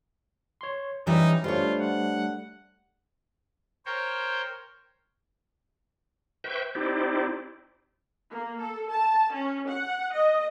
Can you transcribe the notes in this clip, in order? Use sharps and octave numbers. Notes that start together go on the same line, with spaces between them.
C#5 C6
E3 G3 C#4 D#4 G4 E5
G3 A3 D4 F4 C5 C#5
F#5
A#4 C5 C#5 G5
B4 C5 E5 G5 C#6 G6
C4 D#4 E4 G4 C5 D5
A#3
A4
A5
C#4
F#5
D#5